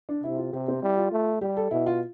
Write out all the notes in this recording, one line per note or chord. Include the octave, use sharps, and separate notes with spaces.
D4
C3 E4
F4
C3 G4
C4
G3 E4
F4
A3
G3 G4
A4
B2 E4
F4